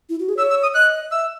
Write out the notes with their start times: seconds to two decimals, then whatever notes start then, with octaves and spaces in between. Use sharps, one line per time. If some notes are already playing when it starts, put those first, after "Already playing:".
0.09 E4
0.20 F#4
0.29 G#4
0.37 C#5 E6
0.50 E6
0.62 D#6
0.74 D#5 F#6
1.11 E5 E6